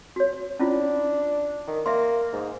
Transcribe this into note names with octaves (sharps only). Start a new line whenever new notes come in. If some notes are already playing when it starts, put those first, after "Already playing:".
F#4 C#5
C#4 D4 E4 F4
D#3
A#3 E5 C6
G#2